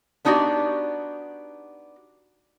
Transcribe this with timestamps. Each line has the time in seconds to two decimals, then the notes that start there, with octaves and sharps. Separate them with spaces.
0.25 B3 D4 D#4 F#4 G4 D5